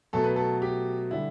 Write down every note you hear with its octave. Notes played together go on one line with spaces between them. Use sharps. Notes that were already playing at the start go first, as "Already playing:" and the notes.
B2 F#3 A3 A4
B4
A4
G4
D3 G3 E4